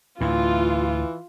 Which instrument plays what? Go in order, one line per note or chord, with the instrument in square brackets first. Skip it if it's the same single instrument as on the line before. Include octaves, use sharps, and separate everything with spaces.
[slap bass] D2 A2 [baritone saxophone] E3 [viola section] F4